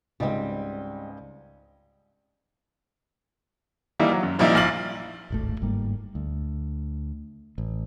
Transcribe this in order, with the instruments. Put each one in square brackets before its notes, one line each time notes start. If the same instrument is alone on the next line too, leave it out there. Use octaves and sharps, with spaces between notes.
[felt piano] C#2 G#2 D#5 [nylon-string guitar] G3 C4
[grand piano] E3 G3 A#3 D#4 E4
F#3
F#2
A#2 F3 G3 A#3 D#4 E4
A#1 F5 A6 F#7
[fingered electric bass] D1 G#1 A3
G1 G#2 G3 A#3
D2
A1